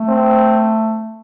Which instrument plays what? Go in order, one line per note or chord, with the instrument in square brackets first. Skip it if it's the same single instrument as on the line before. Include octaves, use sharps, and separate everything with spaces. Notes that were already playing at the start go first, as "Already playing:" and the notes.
Already playing: [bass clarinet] A3
[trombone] C4